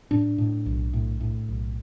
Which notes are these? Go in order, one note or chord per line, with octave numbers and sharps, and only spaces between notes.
A2 D4
A2
B1
A2
A2
B1